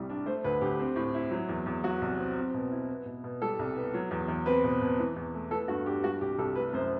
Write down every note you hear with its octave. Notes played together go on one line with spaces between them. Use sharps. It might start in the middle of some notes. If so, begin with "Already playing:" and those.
Already playing: C2 A2 G3
D4
A3 C5
D2 B4
D2 G4
C4
A2
E4
F#3
E2
E2
F#3 F#4
C2
C4
C4
B2
E4
B3
B2
B2
G3 A4
C2
B3
F#3
E2
E2
C4 B4
B2
B2
E3
E2
A3
B3 A4
G2 F#4
D4 G4
G3 F#4
C2 G4
C2 A4
A3 B4
F#2 C5